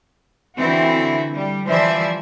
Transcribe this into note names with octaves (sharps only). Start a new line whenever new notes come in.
D3 E3 C4 E4 F#4
G3
E3 F3 G3 C5 D5 E5